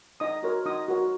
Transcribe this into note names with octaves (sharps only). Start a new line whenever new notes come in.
D#4 D#5 D#6
F#4 A#4 C#5
D#4 D#5 D#6
F#4 A#4 C#5